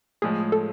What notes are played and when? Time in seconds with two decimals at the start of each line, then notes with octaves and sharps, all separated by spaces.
0.22 A2 F3 G#3 G#4
0.52 A4